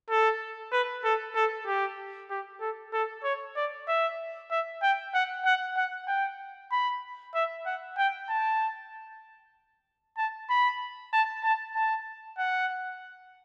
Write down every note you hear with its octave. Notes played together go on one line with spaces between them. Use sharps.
A4
B4
A4
A4
G4
G4
A4
A4
C#5
D5
E5
E5
G5
F#5
F#5
F#5
G5
B5
E5
F#5
G5
A5
A5
B5
A5
A5
A5
F#5